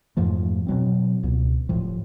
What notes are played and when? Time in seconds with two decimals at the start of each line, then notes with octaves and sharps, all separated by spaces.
0.17 F2 G#2 F3 A3
0.67 B2 F#3 C4
1.23 C#2 B2
1.69 D1 A2 F3